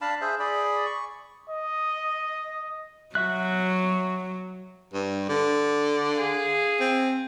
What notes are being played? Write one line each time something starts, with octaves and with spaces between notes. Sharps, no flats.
D4 F5 A5 B5
G#4 C5 E5
G#4 D5 B5
C#6
D#5
F#3 F#4 E5 F#6
G2
D3
G#4 F5
C4